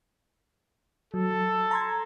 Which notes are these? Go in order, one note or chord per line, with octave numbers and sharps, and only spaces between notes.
F#3 A4
A#5 C6 G#6